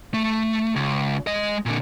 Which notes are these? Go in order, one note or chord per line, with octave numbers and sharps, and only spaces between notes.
A3
C#2
G#3 D#5
A#2 D3